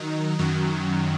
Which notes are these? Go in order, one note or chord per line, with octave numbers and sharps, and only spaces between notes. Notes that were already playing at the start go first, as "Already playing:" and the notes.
Already playing: D#3 F#3 D#4
F#2 D#3 F#3